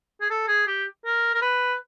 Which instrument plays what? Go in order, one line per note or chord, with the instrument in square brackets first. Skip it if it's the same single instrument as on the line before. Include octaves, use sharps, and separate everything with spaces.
[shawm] G#4
A4
G#4
G4
A#4
A#4
B4